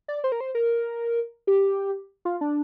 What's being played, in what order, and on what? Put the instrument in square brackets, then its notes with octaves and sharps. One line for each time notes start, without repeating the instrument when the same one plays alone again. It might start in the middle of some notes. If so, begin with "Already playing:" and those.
[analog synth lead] D5
C5
A#4
C5
A#4
G4
F4
D4